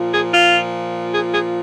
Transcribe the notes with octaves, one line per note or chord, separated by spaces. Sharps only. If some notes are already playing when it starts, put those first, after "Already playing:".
Already playing: A#2 F3
G#4
F4
G#4
G#4